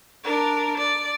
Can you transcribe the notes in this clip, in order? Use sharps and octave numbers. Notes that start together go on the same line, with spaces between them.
D4 A#4
D5